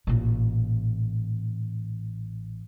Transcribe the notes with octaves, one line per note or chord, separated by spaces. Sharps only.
A1 A#2